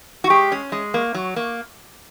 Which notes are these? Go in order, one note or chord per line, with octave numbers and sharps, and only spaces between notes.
F#4
G#3 G4
C#4
G#3
A#3
F#3
A#3